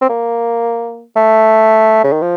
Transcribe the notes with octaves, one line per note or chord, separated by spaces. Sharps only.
C4
A#3
A3
C#3
D#3
F3